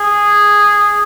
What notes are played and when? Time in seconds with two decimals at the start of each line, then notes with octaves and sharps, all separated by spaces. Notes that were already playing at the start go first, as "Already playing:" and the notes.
Already playing: G#4